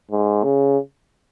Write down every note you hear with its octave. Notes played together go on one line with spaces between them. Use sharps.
G#2
C#3